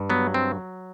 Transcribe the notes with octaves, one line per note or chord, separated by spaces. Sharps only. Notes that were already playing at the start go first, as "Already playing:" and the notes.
Already playing: G2
F#3 B3
C4